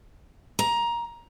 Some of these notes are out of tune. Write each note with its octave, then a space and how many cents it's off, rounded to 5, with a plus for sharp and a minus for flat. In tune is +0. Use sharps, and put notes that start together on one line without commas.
A#5 +15